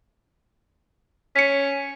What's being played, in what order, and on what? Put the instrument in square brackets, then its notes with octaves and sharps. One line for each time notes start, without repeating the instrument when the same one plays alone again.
[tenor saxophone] C#4 [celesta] B6 C#7